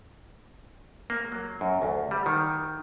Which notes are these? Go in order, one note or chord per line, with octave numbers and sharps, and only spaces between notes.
A#3
F#3
F#2
D2
G3
D#3